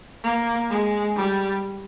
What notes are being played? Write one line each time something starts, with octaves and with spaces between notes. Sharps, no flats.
A#3
G#3
G3